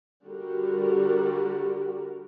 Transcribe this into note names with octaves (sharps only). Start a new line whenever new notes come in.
D3 G3 F#4 G4 A#4